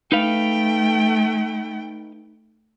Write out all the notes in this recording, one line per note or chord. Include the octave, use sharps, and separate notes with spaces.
A3 D#4 B4 F5 G5